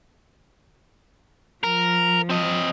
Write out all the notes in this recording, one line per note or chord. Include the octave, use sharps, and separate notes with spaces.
F3 A#4
C4 D#5